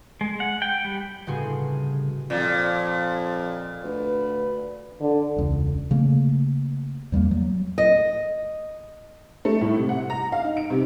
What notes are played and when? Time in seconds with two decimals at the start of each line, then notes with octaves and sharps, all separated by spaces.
0.21 G#3
0.40 F#5
0.62 G5
0.84 G3
1.27 G1 A2 C#3 F#4 G#4 C6
2.30 F2 A#2 F3
3.84 D2 B4
5.01 D3
5.36 E1 C#2
5.91 C#3 A3 A#3
7.12 E2 G3 G#3 A#3
7.31 F#3
7.78 D#5
9.45 A3
9.61 A2
9.77 C3
9.89 F#5
10.10 A#5
10.32 F5
10.44 D#4
10.57 D7
10.70 C3